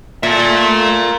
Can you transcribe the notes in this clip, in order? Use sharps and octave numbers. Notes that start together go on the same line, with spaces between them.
A#2 A4 E5